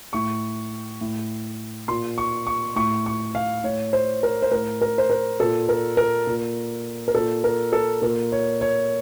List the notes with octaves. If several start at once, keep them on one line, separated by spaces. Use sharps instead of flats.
A2 C#6
A2
A#2 C6
C#6
C#6
A2 C#6
C#6
F5
A2 C#5
C5
A#4
C5
A2 A#4
A#4
C5
A#4
A#2 A4
A#4
A#4
A#2
A#4
A#2 A4
A#4
A4
A#2 A#4
C#5
C#5